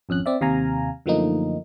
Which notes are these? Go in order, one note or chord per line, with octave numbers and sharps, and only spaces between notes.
G#1 F2 C#4 F#6
C4 D5 E5
D#2 C3 F5 G#5 A#5
F#2 D3 F3 A3 A#3 D#4